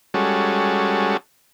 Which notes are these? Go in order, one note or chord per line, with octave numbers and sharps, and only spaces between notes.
G3 G#3 C#4 F#4 A4